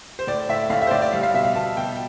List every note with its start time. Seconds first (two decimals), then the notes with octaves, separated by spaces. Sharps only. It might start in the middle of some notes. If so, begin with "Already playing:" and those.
0.19 C5
0.27 A2 D5
0.49 A2 E5
0.70 A2 F5
0.82 E5
0.87 C5
0.91 A2 D5
1.02 D5
1.13 G3 F5
1.23 F5
1.34 B2 E5
1.44 F5
1.55 B2 A5
1.77 B2 G5